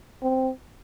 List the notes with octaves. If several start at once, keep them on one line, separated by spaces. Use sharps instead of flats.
C4